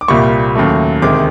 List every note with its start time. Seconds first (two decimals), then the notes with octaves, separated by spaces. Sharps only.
0.01 D6
0.08 C2 A#2 G3 A#3 C#6
0.55 D#2 C#3 F#3 A3
1.02 D2 C3 D#3 G#3 D6